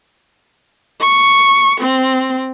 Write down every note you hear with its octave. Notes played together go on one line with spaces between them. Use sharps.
C#6
C4